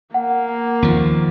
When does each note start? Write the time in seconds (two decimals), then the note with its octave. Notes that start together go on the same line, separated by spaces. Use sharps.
0.14 A#3 F#5
0.82 D#2 F3